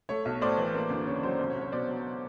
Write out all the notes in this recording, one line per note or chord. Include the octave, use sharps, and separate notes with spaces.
A3 C#5
B1
A2 C5 D5
E3
A#3
D2
C#3 C#5
F#3 C5
C2 C5
C#5
C2
C#5
B2 C5 D5
F#3